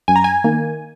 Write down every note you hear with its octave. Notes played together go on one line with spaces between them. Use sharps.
F#2 G#5
A#5
G#5
D#3 A#3